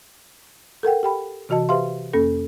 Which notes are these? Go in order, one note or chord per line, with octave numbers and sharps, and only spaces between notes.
A4 A#4 F#5 G5
G4 G5 B5
C3 E3 F#4 D#5 A5
G4 B4 C5 E5 F5 C6
F2 A#3 C#4 A4 A#6